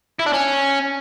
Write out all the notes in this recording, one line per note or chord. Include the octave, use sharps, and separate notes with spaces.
E4
D4
C#4